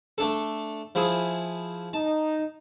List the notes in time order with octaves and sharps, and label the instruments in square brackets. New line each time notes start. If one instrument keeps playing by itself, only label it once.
[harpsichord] A3 D4 A4
F3 E4 G#4
[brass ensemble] D#4 [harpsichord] A5